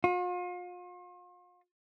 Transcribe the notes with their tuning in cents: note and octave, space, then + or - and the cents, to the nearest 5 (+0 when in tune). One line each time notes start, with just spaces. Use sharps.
F4 +40